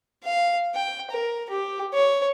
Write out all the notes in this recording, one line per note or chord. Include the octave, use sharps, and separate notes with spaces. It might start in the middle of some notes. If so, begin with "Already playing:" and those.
F5
G5
A#4
G4
C#5